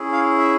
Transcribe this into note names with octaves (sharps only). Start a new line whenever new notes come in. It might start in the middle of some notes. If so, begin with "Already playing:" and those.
Already playing: C#4 E4 G#4
F5
E5